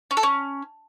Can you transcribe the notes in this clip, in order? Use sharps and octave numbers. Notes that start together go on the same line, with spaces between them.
C#4
A4
C#4